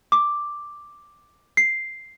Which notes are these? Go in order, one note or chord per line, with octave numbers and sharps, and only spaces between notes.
D6
C7